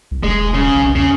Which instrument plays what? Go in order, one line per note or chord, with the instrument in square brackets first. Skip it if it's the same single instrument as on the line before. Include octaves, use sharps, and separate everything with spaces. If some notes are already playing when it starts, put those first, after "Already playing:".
[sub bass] C2
[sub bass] E1 [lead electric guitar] G#3
[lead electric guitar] C#3
[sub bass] B1
[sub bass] E2 [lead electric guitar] C#3